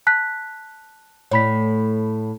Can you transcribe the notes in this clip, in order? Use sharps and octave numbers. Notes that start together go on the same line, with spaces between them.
A5 F#6 B6
A2 C#5 B5 B6